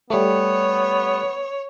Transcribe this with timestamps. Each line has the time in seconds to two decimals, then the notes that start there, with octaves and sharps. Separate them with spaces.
0.10 G3 A3 B3 C#5